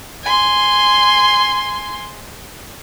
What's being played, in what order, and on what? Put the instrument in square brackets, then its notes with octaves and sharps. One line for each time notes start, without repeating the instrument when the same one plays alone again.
[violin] G#5 C6